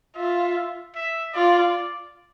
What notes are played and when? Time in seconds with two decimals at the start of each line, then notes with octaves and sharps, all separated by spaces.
0.15 F4 E5
0.95 E5
1.34 F4 D5